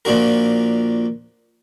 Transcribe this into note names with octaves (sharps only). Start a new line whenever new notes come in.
A#2 F3 D4 F#4 A#4